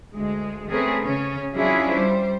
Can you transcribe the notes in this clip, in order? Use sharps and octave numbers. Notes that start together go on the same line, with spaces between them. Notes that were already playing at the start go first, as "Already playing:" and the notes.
D2 G#3
A3 C4 C#4 G#4 A#4 B4
C#3 C#4
F#3 C#4 D4 E4 F4 G#4
G3 C5